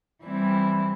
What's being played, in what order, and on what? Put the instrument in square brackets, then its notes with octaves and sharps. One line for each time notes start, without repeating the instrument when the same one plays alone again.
[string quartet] E3 G3 C4 E4